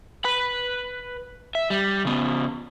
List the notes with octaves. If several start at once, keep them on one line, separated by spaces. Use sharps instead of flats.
B4 B5
E5
G3
C#3 B3